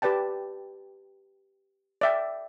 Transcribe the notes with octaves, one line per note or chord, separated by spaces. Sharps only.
G4 B4 D5 G5 A5
D5 E5 G5